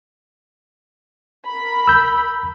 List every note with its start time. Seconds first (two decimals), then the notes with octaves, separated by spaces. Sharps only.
1.48 A#4 B5
1.87 E6 G6